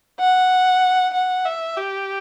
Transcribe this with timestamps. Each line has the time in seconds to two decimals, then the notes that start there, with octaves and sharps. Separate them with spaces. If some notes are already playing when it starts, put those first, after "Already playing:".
0.20 F#5
1.14 F#5
1.45 E5
1.77 G4